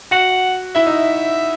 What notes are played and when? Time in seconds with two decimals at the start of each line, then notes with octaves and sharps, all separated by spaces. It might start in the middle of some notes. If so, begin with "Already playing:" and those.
0.11 F#4 F#5
0.75 E4 E5
0.86 D#4